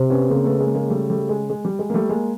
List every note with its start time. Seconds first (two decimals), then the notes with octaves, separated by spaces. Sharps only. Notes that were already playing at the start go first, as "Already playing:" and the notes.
Already playing: C3
0.10 B3 C#4
0.30 C#3 A#3 C4
0.45 A3 B3
0.60 G#3 A#3
0.75 G#3 A#3
0.90 G3 A3
1.10 G3 A3
1.29 G#3
1.50 G#3
1.65 G3
1.79 G#3
1.90 A#3
1.94 G3 A3
2.09 G#3 A#3